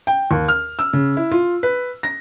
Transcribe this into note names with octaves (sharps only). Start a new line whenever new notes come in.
G5
D#2
F6
E6
C#3
E4
F4
B4
A#6